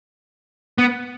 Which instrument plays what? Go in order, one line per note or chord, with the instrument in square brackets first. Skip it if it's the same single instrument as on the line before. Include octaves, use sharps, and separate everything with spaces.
[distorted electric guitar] B3